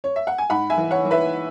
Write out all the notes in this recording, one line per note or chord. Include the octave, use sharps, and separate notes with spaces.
C#5
E5
F#5
G#5
G#2 F#5 B5
E5 G#5
E3
C#5 F#5
E3
B4 E5